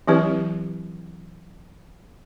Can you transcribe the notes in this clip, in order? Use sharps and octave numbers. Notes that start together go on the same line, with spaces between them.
E3 F#3 C4 E4 G4 B4